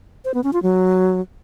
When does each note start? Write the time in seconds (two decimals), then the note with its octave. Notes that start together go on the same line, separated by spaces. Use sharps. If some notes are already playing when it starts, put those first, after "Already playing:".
0.25 C5
0.34 B3
0.44 C#4
0.53 F4
0.63 F#3